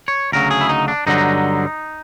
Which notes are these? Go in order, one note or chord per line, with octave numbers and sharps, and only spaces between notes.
C#5
D2 C#3 F#3 A#4
G#4
E4
D#4
D4
G2 D3 F#3 D#4